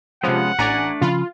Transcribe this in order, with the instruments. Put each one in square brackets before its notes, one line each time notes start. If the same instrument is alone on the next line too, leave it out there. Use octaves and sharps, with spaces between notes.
[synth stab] C3 F3 [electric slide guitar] G#3 B3 C#4 [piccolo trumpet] F#5
[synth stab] A1 G#5 A#5 [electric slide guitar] A3 D4 D5
[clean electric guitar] C#3 F3 B5 [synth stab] F4